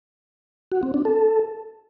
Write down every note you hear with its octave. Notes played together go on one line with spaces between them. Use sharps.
F#4
C4
D4
A4